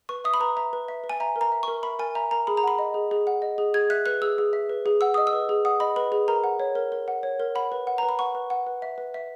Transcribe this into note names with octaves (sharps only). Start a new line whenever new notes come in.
B4 C#6
E5 D#6
B5
B4 A#5
E5 A#5
B4
E5
B4
G#5
E5 A#5
A#4
A#5
E5
C#6
A#4
E5 B5
A#4 G#5
E5 A#5
A#4 A#5
G#4 B5
A#5
F#5 B5
D#5
G#4
G#4
F#5
D#5
G#4
G#4 G#6
E5 F#6
B4 F#6
G#4 E6
G#4
E5
B4
G#4
F#5 E6
D#5 D#6
E6
B4
G#4
F#5 D#6
D#5 B5
B4 B5
G#4
A#4 A#5
F#5
C#5
A#4
A#4
F#5
C#5
A#4
F#5 B5
B4
F#5
B4 A#5
B5
F#5 C#6
B4
F#5
B4
E5
B4
E5